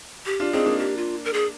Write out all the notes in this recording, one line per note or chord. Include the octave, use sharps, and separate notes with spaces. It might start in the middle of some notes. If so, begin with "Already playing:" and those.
G4
D4 F4
C4 D#4 G#4
A#3 D4
G4
F4
A#4
G#4